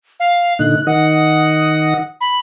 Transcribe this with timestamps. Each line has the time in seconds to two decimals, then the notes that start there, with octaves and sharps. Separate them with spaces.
0.20 F5
0.59 A#2 D3 D#4 F#6
0.87 D#3 D#5 F#5
2.21 B5